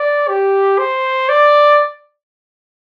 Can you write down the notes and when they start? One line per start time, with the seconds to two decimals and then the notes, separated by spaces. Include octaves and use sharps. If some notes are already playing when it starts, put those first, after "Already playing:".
Already playing: D5
0.29 G4
0.79 C5
1.29 D5